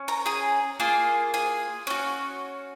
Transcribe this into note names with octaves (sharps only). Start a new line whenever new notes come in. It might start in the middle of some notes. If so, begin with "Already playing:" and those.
Already playing: C#4
A#4 A#5
G#4 G#5
A#3 F4 G#4
G#4 G#5
C#4 F#4